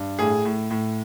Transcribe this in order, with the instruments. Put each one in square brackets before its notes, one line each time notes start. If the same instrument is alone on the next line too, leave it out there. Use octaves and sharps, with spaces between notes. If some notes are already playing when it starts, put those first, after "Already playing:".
Already playing: [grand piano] G2
A2 G#4
A2
A2